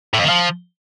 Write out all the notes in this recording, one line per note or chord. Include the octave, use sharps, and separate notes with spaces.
A2
F2
D#3
F3